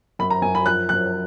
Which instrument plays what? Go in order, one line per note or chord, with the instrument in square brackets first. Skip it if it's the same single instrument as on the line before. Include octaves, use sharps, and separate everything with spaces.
[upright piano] F#2 B5
A#5
F#2 G#5
B5
F3 F#6
F#2 F#6